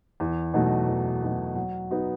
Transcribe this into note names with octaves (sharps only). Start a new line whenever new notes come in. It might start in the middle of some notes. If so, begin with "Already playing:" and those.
E2
B2 F#3 A3 D#4
E2
B2 F#3 A3 D#4
F#3
B3 D#4 F#4